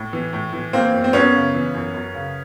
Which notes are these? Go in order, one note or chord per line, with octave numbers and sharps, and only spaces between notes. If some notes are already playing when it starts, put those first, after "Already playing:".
Already playing: A2
E3
A2
E3
E3 A#3 C4
F#2
C4
F#2 B3 C#4
C#3
E3
F#2
F#2
C#3